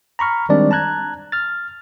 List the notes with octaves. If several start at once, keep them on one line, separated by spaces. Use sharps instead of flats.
A#5 B5 C#6 F6
D#3 G3 G#3 C4 D4 D5
A5 A#5 F#6 G#6
F6 A6